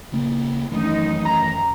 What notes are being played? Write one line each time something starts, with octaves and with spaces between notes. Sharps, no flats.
A#1 C#3 A#3
F#2 D#3 E3 A3 D#4
F#2 A#5